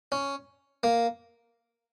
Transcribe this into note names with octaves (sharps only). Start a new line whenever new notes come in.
C#4
A#3